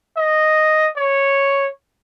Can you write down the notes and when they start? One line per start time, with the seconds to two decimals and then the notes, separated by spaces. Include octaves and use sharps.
0.17 D#5
0.96 C#5